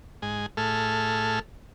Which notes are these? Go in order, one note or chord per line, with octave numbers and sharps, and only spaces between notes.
G#2 G#3 G#5
A2 A3 G#4 A4 F6